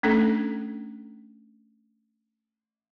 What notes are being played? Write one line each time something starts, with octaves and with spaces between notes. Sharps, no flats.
A3 C#4 D4 A4